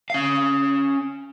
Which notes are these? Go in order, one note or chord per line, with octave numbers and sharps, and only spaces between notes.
C#4 F5